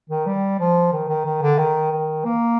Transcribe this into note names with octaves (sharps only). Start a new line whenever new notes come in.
D#3
G3
F3
D#3
D#3
D#3
D3
D#3
D#3
A#3